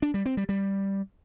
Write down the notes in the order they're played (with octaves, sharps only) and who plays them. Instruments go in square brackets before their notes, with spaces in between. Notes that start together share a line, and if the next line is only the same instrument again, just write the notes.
[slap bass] D4
G3
C4
G3
G3